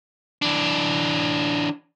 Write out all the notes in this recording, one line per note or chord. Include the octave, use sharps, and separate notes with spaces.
E3 D4